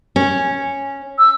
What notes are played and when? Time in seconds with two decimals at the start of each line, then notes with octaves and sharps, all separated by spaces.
0.16 C#4
1.18 E6